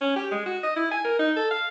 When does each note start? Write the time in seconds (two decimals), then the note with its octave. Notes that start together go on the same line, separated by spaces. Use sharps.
0.01 C#4
0.16 G4
0.32 G#3
0.46 F#4
0.63 D#5
0.76 E4
0.91 G#5
1.05 A#4
1.19 D#4
1.37 A4
1.51 F5